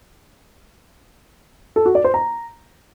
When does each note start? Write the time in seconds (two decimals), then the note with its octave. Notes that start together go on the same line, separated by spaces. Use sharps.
1.76 A4
1.85 F#4
1.95 D5
2.04 C5
2.14 A#5